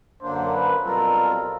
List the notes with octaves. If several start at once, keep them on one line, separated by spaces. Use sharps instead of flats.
F#2 D3 F#3 A#3 D4 C5
B4
B2 G3 C4 F4 A4 A#4